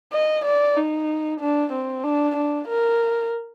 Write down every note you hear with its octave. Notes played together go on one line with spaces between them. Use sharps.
D#5
D5
D#4
D4
C4
D4
D4
A#4